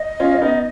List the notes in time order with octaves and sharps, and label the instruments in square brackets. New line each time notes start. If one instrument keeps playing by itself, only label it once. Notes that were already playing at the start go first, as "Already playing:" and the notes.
Already playing: [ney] D#5
[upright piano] C#4 F4
C#4
B3 D#4